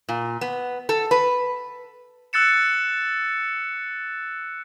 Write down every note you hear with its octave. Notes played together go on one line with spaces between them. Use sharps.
A#2
B3
A4
B4
E6 F#6 A6 C#7 E7